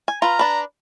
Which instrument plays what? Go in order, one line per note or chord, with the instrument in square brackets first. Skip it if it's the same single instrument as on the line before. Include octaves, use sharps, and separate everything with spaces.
[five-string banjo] G#5
[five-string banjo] F4 B4 [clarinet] A#5
[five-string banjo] D4 B4